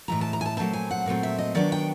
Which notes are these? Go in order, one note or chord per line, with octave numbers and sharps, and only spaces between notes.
A2 E3 G#3 A#5
A5
A#5
G#5
A5
A#2 F#3 A3 C4 A5
G#5
F#5
A#2 F#3 A3 C4
E5
D#5
D#3 F#3 B3 D4 D5
G5